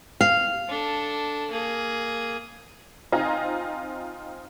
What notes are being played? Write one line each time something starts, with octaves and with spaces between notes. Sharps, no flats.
F5
D4 A4
A#3 G#4
C4 D#4 F4 D#5 G#5 A#5